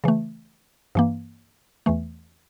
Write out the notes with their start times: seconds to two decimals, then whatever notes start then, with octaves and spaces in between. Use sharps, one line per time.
0.04 C#3 E3 A3
0.95 G2 E3 A#3
1.86 E2 E3 A3